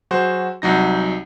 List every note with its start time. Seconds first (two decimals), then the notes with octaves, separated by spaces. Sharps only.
0.11 F#3 F#4 G#4 C5
0.62 C2 F#3 D#4 A#6